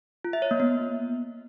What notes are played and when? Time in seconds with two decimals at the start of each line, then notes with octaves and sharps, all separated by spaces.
0.24 F4
0.33 E5
0.42 C#5
0.51 A#3
0.60 B3